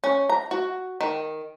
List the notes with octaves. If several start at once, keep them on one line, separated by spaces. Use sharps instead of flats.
C#4
A#5
F#4
D#3